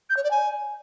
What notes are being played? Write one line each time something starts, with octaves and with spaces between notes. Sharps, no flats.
G6
C#5
D5
G#5